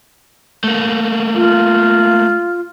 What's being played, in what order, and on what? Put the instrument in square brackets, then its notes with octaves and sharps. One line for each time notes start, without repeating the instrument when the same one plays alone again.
[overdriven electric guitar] A3 A#3
[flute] F4